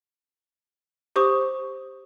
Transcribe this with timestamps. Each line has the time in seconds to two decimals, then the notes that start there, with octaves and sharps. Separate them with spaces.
1.16 G4 C5 C#6 D#6